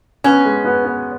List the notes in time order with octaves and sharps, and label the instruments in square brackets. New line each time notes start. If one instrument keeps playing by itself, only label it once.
[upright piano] B3 [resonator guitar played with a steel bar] C#4
[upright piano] G#3
B3
B3